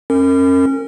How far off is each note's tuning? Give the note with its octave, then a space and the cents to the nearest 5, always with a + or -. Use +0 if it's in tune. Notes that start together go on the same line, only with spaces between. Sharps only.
C#4 -30 A#4 -30